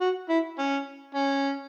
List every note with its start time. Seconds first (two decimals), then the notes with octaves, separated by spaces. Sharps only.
0.01 F#4
0.29 E4
0.59 C#4
1.15 C#4